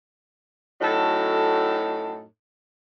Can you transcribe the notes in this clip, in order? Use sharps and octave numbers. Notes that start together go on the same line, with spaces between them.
F#2 A2 F#3 D#4 A4